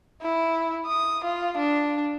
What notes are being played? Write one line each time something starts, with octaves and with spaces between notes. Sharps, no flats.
E4
D#6
F4
D4